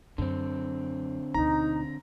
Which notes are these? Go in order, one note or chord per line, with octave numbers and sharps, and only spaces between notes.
F#2 D3 C4
D2 B2 D#4 A#5